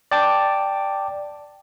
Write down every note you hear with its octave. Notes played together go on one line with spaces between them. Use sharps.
D5 G5 A5 D6